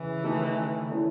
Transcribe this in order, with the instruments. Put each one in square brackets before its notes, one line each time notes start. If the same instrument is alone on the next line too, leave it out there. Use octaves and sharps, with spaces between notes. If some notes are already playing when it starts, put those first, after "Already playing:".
Already playing: [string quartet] C#3 E3
[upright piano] D#3 A3 D#4 A4
E3 A3 C#4 E4